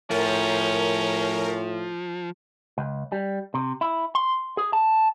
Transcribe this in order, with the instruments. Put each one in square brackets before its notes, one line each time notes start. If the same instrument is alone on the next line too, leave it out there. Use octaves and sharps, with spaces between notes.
[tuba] A2 [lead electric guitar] F3 [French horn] C#4 [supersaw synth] A#4
[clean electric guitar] C#2
G3
C3
E4
C6
G#4
A5